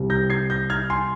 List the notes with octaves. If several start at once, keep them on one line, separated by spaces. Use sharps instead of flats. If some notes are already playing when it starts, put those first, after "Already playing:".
Already playing: C2 C3 G3
G6 A#6
G#6 C7
G6 A#6
F6 G#6
G#5 C6